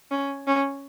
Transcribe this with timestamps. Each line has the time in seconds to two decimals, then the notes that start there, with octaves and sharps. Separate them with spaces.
0.11 C#4
0.47 C#4